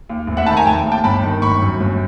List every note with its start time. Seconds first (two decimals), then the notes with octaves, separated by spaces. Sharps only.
0.10 D#2
0.27 F1
0.37 E5 F#5
0.47 D#3 A5 B5
0.57 G#5 A#5
0.66 F1 G5 A5
0.86 D#2
0.92 G5 A5
1.04 G1 A5 B5
1.23 D#3
1.42 G1 B5 C#6
1.61 F#2
1.81 G1